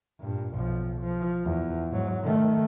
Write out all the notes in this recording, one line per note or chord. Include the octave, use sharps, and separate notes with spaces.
G2 A#2
B1 F3
F3
E2
G#2 F#3
D#3 A3